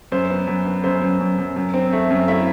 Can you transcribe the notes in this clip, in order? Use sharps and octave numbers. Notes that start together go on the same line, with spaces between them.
F#2 C5
B3
F#2
B3
F#2 C5
F#2
F#2
F#2
F#2
C4
A3
F#2
A3 E4 E5